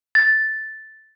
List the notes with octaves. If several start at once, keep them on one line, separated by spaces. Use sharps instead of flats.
A6